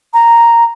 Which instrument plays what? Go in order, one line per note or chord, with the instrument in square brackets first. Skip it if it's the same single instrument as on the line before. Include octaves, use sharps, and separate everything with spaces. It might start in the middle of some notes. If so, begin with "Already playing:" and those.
[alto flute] A#5